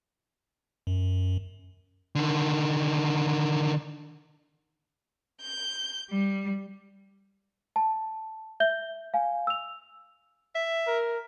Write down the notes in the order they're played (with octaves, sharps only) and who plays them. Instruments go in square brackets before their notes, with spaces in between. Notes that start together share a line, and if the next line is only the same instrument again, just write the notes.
[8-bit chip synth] F#2
[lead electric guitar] D3 D#3
[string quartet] G6
G3
[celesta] A5
E5 G6 G7
F5 G#5
E6 F7
[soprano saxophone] E5
[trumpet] A#4